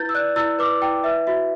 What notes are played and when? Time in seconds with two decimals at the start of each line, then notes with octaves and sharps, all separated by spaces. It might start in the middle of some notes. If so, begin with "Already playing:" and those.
Already playing: E4 B4 G6 A6
0.09 E6
0.15 D5 F#6
0.36 E4 E6
0.59 B4 D6
0.82 E4 G5
1.04 B4 E5
1.27 F#4 E5